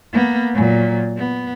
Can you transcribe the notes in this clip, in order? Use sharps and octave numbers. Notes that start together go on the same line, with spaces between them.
A#3 B3
A#2 F#3
B3